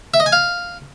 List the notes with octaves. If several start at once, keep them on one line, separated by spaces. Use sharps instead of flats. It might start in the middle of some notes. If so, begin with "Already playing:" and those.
E5
D#5
G#5
F5